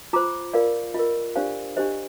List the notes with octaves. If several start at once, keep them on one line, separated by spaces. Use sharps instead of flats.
F4 C5 A#5 D6
F4 A#4 D5 F5
F4 A#4 D#5
D4 G4 C5 D5 F5
D4 G4 C5 D#5